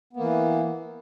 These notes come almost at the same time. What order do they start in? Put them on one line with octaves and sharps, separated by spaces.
B3 A#3 E3